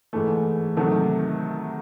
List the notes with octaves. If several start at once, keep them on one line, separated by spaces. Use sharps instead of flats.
G#2 E3 A3
C3 D#3 F#3 A3